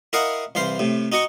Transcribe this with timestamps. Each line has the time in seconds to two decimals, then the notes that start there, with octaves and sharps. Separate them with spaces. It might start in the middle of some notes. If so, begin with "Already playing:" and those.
0.13 E4 A#4 D#5 F5 F#5 C#6
0.55 C2 E3 C5 F5
0.79 A2 C3
1.12 D#4 F#4 D#5 C#6